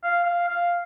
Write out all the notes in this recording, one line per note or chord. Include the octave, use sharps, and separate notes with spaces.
F5
F5
F5